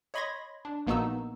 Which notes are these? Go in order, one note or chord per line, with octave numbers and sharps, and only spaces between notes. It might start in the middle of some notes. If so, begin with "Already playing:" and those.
C#5 D#5 B5 C6 G#6 A#6
D4
A#1 A#3 B3 D#4 F#4 E6